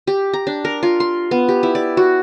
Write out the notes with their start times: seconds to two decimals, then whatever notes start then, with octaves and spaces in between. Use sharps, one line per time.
0.07 G4
0.34 A#5
0.47 D4
0.65 A#4
0.83 F4
1.00 C6
1.31 B3
1.49 G4
1.63 E4
1.75 D5
1.97 F#4